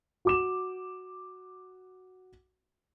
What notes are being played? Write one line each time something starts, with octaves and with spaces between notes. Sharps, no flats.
F#4 D6 E7